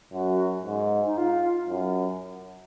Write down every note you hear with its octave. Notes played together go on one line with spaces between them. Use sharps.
F#2 F#4
G#2
D#4
F4
F#2